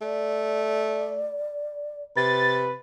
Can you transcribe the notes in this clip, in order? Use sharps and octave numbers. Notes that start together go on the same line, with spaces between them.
A3 D5
C3 B4 A6